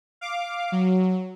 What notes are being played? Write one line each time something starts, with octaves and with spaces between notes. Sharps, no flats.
F5 D6
F#3